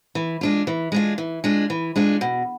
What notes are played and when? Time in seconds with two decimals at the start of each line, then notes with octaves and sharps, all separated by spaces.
0.15 E3
0.41 G#3 D4 F4
0.67 E3
0.92 G#3 D4 F4
1.18 E3
1.44 G#3 D4 F4
1.70 E3
1.96 G#3 D4 F4
2.21 B2